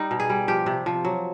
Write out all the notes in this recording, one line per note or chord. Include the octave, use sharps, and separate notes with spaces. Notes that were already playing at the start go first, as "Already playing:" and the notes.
Already playing: G3 D#4
B2
G#4
G3
F3 G4
C3
F3
F#3